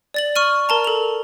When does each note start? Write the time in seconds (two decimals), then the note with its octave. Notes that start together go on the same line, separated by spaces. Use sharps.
0.14 D5 A6 F#7
0.36 C#6 F6 D#7
0.69 A#4 A5 A#5
0.85 A4 F7